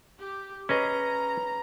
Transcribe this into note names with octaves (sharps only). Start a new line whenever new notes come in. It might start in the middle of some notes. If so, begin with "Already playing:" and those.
G4
C#4 G#4 B4 D#5 A#5